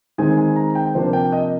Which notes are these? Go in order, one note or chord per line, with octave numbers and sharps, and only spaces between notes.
D#3 G#3 C4 D#4 G#5
G#5
A#5
G5
C3 F3 A#3 D4 C5
G5
D#5